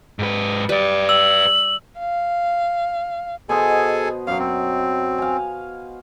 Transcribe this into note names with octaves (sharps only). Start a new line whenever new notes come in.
G#2 B4
G3 B4 D5
E6 F#7
F5
B2 G#4 A4 C5 D#5 G#5
F#2 F#3 F5
C4
F5 G#5